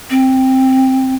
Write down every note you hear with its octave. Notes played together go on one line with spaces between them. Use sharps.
C4